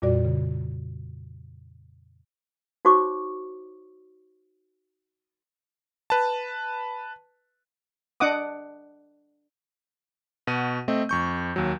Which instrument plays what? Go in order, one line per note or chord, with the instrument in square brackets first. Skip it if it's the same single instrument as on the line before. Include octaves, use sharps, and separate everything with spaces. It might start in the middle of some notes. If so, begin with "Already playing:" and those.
[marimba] F2 A#2 G3 F#4 D5
C#3
[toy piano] D#4 F#4 C5 C#5 C#6 D6
[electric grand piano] B4 A5
[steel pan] D4 D#5 F#5 D6 D#6
[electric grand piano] B2 F#4 D#7
A3 C4 D#5
F2 C#6 G6
D#2 F#3